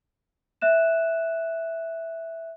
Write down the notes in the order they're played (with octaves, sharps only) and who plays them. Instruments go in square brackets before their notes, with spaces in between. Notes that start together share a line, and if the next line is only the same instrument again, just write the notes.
[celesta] E5 F#6 E7